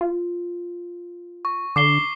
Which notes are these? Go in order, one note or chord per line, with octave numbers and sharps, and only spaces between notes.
F4
C#6
D3 D6 C7 G7